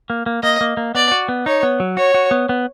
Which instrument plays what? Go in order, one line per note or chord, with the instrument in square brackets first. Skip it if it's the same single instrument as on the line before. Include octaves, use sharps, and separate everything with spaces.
[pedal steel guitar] A#3
A#3
[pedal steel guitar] A#3 [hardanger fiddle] D#5
[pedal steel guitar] A#3
A#3
[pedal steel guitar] B3 [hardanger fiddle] D5
[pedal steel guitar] F#4
B3
[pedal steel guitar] D#4 [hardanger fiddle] C#5
[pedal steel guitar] B3
F#3
[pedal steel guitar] F#4 [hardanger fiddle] C#5
[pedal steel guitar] F#4
B3
B3